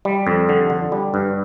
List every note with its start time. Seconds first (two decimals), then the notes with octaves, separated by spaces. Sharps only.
0.05 G3
0.27 F2
0.49 D3
0.70 D3
0.92 G3
1.14 G2